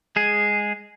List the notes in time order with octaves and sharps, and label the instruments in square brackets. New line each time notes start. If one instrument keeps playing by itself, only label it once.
[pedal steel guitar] G#3 G#4